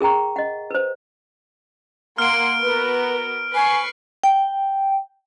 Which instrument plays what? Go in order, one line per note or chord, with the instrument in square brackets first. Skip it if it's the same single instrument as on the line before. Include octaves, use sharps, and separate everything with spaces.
[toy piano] G#4 A#4 G5 A#5 C#6
D#5 F#5
B4 C5
[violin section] A#3 F#5 C6 [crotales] F6 D7
[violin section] B3 F#4 A#4 [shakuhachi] B4
[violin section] B4 C#6 C7 [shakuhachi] G#5
[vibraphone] G5